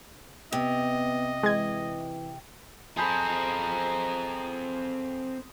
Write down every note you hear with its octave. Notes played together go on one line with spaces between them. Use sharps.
C3 B3 D#5
E3 G#3 G#6
C4 G#4 A4 C5 D#5 A#5 B5